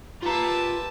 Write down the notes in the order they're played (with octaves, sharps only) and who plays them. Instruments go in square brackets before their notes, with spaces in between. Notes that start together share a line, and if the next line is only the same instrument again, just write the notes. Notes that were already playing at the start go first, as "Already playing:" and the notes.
[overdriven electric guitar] F4 A#5 [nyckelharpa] G4 A5 [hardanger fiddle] B4 E5